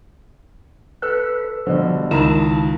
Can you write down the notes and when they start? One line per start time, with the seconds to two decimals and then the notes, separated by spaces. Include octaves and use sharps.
1.02 A4 B4 E6
1.67 G2 B2 D3 F3
2.11 C#2 D#3 E4 A5 A#5